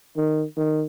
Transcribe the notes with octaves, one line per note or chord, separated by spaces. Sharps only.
D#3
D#3